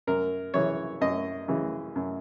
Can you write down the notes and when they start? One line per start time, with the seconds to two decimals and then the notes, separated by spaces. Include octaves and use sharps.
0.07 F#2 A#4
0.54 C#3 E3 C#5
1.01 F#2 D#5
1.48 C#3 E3
1.96 F#2